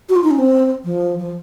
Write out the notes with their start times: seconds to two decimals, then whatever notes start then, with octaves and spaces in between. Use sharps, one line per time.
0.09 F#4
0.16 F4
0.24 D#4
0.31 C#4
0.39 C4
0.84 F3
1.19 F3